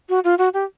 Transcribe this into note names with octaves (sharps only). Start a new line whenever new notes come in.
F#4
F4
F#4
G4